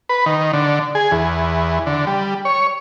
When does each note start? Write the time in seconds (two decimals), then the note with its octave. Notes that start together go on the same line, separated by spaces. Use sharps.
0.09 B4
0.26 D#3
0.53 D3
0.95 G#4
1.12 E2
1.86 D3
2.07 G3
2.45 C#5